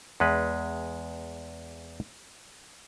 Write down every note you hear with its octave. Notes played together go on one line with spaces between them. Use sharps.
E2 G#3 B4